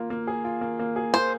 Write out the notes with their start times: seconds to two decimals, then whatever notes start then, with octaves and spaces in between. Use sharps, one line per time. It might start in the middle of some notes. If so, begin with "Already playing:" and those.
Already playing: A#3 F4
0.10 A#3
0.27 G#4
0.45 F4
0.61 A#3
0.79 A#3
0.96 G#4
1.14 A#3 C5